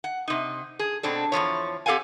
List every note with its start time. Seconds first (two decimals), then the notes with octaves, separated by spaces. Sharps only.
0.04 F#5
0.28 C3 D#4
0.79 G#4
1.03 B2 C4 D4 A4
1.32 E2 C3 F3 C#5
1.86 C4 G4 A4 F5 F#5 G#5